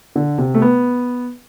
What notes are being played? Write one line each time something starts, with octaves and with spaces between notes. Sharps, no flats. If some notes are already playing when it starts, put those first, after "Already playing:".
D3
C3
A3
B3